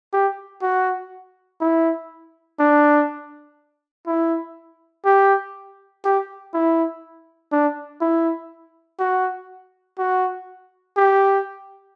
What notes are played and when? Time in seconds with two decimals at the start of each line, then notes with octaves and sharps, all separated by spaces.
0.13 G4
0.62 F#4
1.61 E4
2.59 D4
4.07 E4
5.05 G4
6.04 G4
6.54 E4
7.52 D4
8.01 E4
8.99 F#4
9.98 F#4
10.97 G4